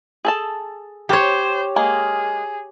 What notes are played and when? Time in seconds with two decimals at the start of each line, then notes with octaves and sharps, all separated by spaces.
0.25 G#4 A4 A5
1.09 G4 C5 C#5
1.76 G#3 A#3 G#4